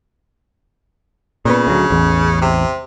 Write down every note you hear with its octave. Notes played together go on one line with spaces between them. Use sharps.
A#2 C#3 B3
D2 F#3
A1 E2
C3